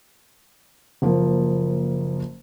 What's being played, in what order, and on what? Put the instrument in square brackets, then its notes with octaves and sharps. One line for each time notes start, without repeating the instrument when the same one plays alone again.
[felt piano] F#1 F3 A#3